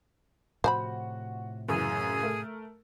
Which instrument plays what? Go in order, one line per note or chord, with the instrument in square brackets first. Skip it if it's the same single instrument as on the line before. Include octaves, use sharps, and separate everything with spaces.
[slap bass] A2 C3 F3 [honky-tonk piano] F#4 [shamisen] C5 G#5 B5
[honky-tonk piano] F#2 C#3 E3 [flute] G#4
[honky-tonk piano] A3 A#4